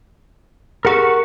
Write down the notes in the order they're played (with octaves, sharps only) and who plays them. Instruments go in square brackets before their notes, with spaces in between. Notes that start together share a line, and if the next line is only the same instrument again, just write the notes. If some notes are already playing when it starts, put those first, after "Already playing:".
[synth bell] G4 G#4 [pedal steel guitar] A#4 F#5 C#6